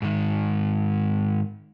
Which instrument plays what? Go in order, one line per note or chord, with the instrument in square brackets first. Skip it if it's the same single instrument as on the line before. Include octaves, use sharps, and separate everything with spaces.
[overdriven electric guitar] G#2 D#3